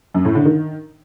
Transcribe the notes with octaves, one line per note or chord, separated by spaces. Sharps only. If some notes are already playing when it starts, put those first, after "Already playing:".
F#2
A2
D3
D#3